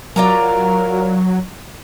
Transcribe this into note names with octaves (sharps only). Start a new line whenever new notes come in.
F#3 F4 A#4 D5 A#5